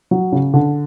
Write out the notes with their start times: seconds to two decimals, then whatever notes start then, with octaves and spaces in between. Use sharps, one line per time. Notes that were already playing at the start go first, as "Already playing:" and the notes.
0.11 F#3
0.32 C#3
0.54 D3